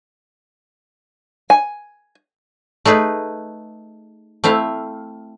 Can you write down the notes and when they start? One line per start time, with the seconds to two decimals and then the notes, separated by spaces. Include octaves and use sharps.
1.50 G#5
2.85 A3 D#4 G#4 B4
4.44 A3 C4 E4 F5